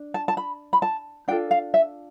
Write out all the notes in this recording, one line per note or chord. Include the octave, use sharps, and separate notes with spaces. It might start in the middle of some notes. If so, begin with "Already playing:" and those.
Already playing: D4
A5
A5
B5
B5
A5
D4 F4 A4 G5
F5
E5